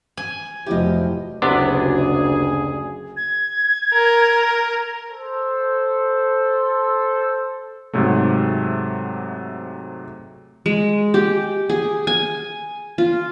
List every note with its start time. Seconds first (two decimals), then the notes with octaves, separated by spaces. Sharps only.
0.17 G#5
0.66 F1 F3 F#3 E4 G4 D#5
1.42 F#1 D2 C3 B3 D4 G#4
3.17 G#6
3.93 A#4
5.10 A4 C5
7.93 G#2 C3 F#3 A3
10.66 G#3
11.14 G4
11.69 G#4
12.07 G#5
12.98 F4